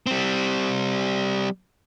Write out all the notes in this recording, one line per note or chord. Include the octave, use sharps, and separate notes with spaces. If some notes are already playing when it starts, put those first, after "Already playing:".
G3 C4